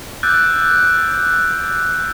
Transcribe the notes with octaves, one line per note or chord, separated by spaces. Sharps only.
D6 E6 F#6 G6 A6 D7